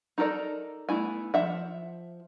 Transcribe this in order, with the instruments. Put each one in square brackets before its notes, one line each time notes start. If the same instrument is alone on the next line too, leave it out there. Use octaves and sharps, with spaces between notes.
[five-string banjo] D#4 A4 A#4 D5
A3 B3 E4 G#5
F3 E5 F#5